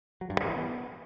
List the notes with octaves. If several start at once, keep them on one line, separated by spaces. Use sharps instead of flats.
F#3
G2
G3
E3
B3